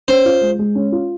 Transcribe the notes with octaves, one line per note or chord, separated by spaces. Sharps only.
C#4 C5
F4
G#3
G#3
C#4
F4